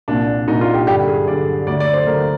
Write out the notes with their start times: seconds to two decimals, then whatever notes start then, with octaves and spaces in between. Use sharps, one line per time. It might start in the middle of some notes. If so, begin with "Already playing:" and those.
0.08 C2 A#2 D4
0.48 C2 A#2 D#4
0.61 F4
0.74 G4
0.87 G2 D3 G4
1.08 G#4
1.28 G2 D3 D5
1.67 D2 D3 D5
1.80 D5
1.93 C5
2.07 D2 D3 A#4